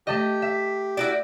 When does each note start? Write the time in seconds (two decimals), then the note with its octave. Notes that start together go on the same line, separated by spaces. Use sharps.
0.07 A3 G4 A4 D#5
0.42 E5
0.97 E4 F#4 D5